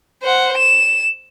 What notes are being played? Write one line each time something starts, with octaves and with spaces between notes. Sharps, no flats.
C5 F#5
E7